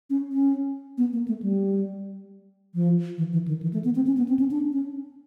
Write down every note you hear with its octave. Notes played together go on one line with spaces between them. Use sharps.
C#4
C#4
B3
A#3
A3
G3
F3
E3
E3
D#3
E3
A3
B3
C4
C#4
B3
C4
C#4
D4
C#4